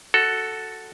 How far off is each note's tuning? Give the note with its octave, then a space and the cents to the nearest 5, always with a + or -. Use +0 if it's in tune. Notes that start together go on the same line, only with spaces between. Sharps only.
F#4 +0 A4 +0